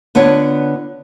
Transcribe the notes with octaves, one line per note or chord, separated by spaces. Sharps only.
D3 B3 D4 F4 C#5